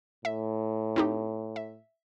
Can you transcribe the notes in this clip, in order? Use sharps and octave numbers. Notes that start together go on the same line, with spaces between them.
A2 E5
C4 D#4 G4
E5